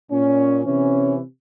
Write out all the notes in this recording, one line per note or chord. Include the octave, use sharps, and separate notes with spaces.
A#2 C#4
C3 E3 C#4